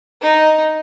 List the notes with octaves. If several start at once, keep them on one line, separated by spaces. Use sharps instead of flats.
D#4